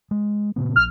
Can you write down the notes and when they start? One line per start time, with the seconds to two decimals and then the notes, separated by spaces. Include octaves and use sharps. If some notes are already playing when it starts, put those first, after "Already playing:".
0.11 G#3
0.56 A#2 C#3 B3
0.76 A#1 F6